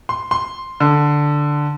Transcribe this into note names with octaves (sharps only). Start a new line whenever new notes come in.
C6
C6
D3